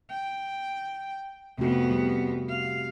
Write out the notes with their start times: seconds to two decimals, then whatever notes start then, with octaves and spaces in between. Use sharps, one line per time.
0.10 G5
1.59 F2 C3 A3 B3 F#4
1.91 G3
2.49 F5